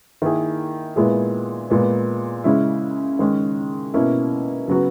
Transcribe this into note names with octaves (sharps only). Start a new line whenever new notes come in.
D#3 A#3 E4 G#4
A#2 G#3 B3 E4 G#4
A#2 G#3 B3
C#3 G#3 C#4 E4
D#3 G#3 C#4
B2 A#3 C#4 E4
C#3 F#3 B3 F#4